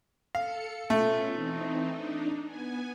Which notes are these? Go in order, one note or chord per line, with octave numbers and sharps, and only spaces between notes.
A4 F5 C#7
B2 A3 C#4 F4
E3 C4 D#4
D4 D#4
B3 G#5